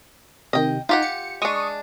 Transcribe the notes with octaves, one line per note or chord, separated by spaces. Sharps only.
C3 D#3 D#5 G5
D#4 F4 G4 F#5
C#7
G#3 D4 C#6 D#6